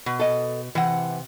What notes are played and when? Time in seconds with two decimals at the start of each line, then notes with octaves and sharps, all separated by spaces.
0.06 B2
0.20 A4 D#5
0.75 C3 E3 F#5